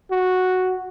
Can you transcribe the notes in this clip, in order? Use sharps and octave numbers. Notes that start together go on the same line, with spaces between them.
F#4